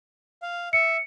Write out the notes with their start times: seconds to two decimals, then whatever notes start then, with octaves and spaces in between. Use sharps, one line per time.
0.42 F5
0.73 E5 C#7